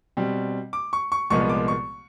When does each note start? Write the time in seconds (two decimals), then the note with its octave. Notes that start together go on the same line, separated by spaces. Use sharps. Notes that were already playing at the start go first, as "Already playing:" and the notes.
0.17 B2 G3 C4
0.73 D6
0.93 C#6
1.12 C#6
1.30 C2 A#2 F3 G#3 B3 C#6
1.49 D6
1.68 C#6